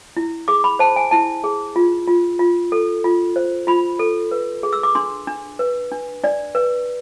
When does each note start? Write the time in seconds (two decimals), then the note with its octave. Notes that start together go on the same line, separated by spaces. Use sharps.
0.17 E4
0.48 G#4 D6
0.64 B5
0.79 C5 A5
0.96 G#5
1.11 E4 A5
1.44 G#4
1.76 F4
2.07 F4
2.39 F4
2.72 A4
3.04 F4
3.36 C5
3.67 F4 B5
3.99 A4
4.31 B4
4.63 G#4
4.73 E6
4.83 D6
4.95 D4 C6
5.27 D4
5.59 B4
5.92 D4
6.24 D4 D5
6.55 B4